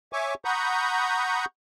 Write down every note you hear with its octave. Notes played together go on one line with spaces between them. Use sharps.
C#5 E5 G#5 C#6 D6
F#5 A#5 B5 C#6 D#6 G6